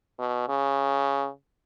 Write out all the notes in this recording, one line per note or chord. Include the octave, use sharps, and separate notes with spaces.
B2
C#3